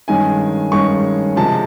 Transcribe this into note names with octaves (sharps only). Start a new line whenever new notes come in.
G2 D#3 G#3 C#4 G#5
G2 D#3 G#3 C#4 C#6
C3 F3 G#3 A5